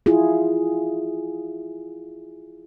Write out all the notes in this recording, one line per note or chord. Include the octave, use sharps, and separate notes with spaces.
E4 F4 G#4